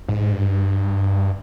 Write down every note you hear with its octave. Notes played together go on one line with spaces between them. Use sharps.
G#2
G2